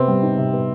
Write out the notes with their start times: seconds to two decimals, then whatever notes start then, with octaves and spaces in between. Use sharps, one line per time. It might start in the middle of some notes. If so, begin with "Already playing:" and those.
Already playing: C3 B3 C4
0.08 G3
0.23 D#4
0.37 C3
0.53 B3